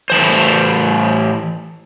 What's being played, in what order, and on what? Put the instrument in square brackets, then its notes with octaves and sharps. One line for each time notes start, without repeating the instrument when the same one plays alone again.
[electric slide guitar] A2 E3 C5